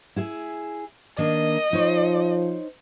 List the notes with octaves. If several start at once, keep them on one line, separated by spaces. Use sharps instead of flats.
E4 G#4 E5
D#3 A#3 D4 D#5
F3 D#4 C5 C#5